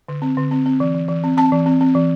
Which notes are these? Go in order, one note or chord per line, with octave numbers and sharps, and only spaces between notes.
D3
C4
D3
C4
C4
E3
E3
E3
C4
C4 A5
E3
C4
C4
E3